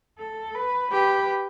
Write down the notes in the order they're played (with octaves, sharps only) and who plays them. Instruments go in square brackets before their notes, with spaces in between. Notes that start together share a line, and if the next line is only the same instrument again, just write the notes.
[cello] A4
B4
[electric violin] G4 [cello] B4